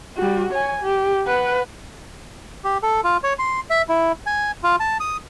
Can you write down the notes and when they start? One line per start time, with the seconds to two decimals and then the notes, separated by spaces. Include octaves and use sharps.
0.17 G3 F#4
0.53 C#5 G#5
0.82 G4
1.27 B4 F#5
2.64 G4
2.83 A4
3.04 F4
3.23 C#5
3.39 C6
3.70 E5
3.89 E4
4.26 G#5
4.64 F4
4.80 A5
5.00 D#6